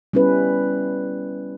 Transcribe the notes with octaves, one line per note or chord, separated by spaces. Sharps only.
G3 B3 C#4 E4 B4